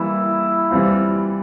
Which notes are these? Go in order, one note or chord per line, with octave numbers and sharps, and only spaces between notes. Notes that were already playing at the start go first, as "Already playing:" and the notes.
Already playing: E3 G3 A#3 E4
E3 G3 C4 F4